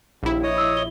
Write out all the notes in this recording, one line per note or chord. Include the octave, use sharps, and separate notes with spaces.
A#1 D#2 E4
C#5 D#5 D#6
E6
G7